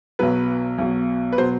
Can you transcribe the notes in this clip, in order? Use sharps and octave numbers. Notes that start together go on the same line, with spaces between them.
B1 B2 F#3 B4
B1 B2 F#3
B4
B2 F#3 C5